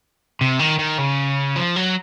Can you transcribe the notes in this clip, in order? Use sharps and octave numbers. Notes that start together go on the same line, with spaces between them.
C3
D#3
D#3
C#3
F3
F#3